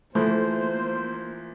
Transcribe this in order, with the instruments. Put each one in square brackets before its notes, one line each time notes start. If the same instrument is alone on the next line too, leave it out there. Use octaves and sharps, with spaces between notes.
[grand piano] E3 F3 [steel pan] A3 [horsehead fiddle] A#3 [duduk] C5